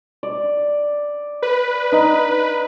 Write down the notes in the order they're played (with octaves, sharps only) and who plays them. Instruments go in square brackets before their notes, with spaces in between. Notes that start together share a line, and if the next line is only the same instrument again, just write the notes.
[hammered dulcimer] D5
[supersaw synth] B4
[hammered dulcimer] D#4